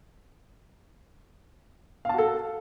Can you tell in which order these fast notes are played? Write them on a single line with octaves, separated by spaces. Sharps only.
F5 A5 F#4 A4